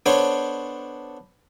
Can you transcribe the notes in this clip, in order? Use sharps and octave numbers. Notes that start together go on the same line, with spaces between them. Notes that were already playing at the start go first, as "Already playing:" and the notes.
B3 D4 A4 C5 C#5